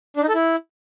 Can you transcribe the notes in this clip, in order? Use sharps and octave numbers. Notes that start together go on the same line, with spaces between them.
D4
D#4
A4
E4